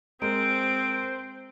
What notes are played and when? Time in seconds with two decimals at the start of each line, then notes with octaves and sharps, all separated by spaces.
0.22 G#3 C4 A#4 C5 D7